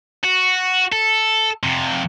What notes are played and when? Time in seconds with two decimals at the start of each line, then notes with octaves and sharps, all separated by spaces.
0.24 F#4
0.92 A4
1.63 F2 C3